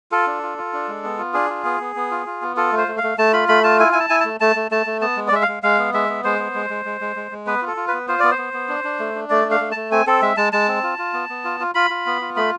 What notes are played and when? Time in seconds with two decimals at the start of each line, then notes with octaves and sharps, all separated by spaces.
0.12 F4 A4
0.27 D4
0.43 F4
0.58 F4
0.73 D4
0.88 G#3
1.04 B3
1.18 F4
1.34 D4 G#4
1.50 F4
1.64 B3
1.81 B3
1.96 B3
2.11 F4
2.26 F4
2.42 B3
2.57 F4 A4
2.72 A3
2.78 C5
2.88 A3
2.97 F5
3.03 A3
3.18 A3 A5
3.33 F4 B5
3.49 A3 B5
3.64 F4 A5
3.79 E4 G#5
3.92 E4 G#5
4.00 A5
4.10 E4 G#5
4.20 A3 A5
4.40 A3 A5
4.56 A3
4.71 A3 A5
4.86 A3
5.01 B3 A5
5.17 G#3
5.28 D5
5.32 G#3 E5
5.42 F5
5.48 G#3
5.63 G#3 F5
5.78 B3
5.94 G#3 E5
6.09 B3
6.24 G#3 C5
6.39 B3
6.55 G#3
6.70 G#3
6.85 G#3
7.01 G#3
7.16 G#3
7.31 G#3
7.47 B3 B4
7.62 F4
7.67 A4
7.77 F4
7.88 B4
7.93 B3
8.08 F4 C5
8.20 B3 D5
8.31 C5
8.38 B3
8.53 B3
8.69 D4
8.84 D4
8.99 A3
9.15 D4
9.30 A3 D5
9.45 D4
9.51 F5
9.60 A3
9.71 A3 A5
9.91 C4 G#5
10.07 C4 A4
10.22 G#3 E5
10.37 G#3 A5
10.53 G#3 A5
10.68 C4
10.83 F4
10.99 F4
11.13 B3
11.30 B3
11.45 F4
11.60 F4
11.75 F4 B5
11.90 F4
12.06 B3
12.21 F4
12.36 A3 B5